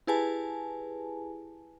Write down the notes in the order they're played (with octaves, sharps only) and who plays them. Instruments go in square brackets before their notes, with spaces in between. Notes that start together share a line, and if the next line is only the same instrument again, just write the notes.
[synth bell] E4 G4 G#4 B4 G#5 A5